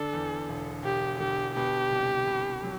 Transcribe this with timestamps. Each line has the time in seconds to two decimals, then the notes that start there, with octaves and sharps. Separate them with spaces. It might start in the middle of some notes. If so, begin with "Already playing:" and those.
Already playing: D3 D4 A4
0.13 E2
0.49 E1
0.84 E1 G4
1.20 D3 G4
1.55 B2 G4
1.92 C2
2.27 C2
2.63 F#3